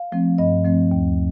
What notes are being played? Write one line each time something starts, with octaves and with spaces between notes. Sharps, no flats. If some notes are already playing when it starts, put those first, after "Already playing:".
Already playing: F5
F3 A3 C4
G2 D#5
F3 A3 C4
D#2